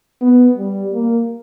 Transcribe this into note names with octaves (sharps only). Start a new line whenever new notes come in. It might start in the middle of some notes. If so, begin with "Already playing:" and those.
B3
G3
A#3